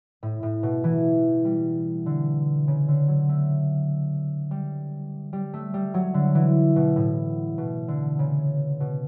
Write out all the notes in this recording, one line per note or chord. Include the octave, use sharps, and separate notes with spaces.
A2
A2
B2
E3
G3
D3
C#3
D3
F#3
A3
G3
G3
A3
G3
F#3
D3
E3
B2
A2
B2
D3
C#3
B2